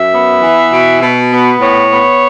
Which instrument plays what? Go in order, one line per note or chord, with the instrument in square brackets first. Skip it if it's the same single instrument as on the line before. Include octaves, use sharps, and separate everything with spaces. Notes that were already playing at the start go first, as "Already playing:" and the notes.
Already playing: [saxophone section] F#2 E5
B3
E3
B2
B2
B3
A2 C#5
B3